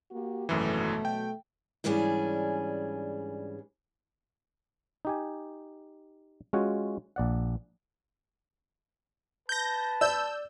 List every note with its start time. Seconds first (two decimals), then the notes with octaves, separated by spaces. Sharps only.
0.11 A#3 F#4 G4
0.49 G#1 F#2 B2 E3 F#3 A3
1.05 G5
1.84 G#2 E3 G3 C#4 D4 G#4
5.05 D#4 G4 G#5
6.53 G#3 C#4 F4 F#4 F#5 G#5
7.16 A#1 D5 F#5
9.49 B4 A5 G6 A#6
10.01 D5 E6 G6